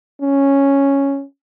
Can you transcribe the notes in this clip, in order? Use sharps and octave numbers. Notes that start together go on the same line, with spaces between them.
C#4